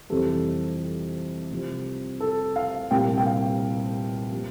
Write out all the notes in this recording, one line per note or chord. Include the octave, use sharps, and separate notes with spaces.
F2 C3 E3 G3 A4
C2 C3 F3
A4
F5
C2 A#2 G3 G5
G5
F5
C3 F3 A#3